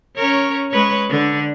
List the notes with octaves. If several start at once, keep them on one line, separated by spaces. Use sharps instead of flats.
C#4 A#4 C#5
G#3 B4 C#5
D3 D4